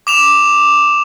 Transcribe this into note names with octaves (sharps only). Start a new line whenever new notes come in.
D6 E7 F7